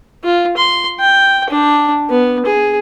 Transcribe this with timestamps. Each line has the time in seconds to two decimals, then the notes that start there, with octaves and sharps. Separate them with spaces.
0.24 F4
0.57 C6
1.00 G5
1.50 D4
2.10 B3
2.46 G#4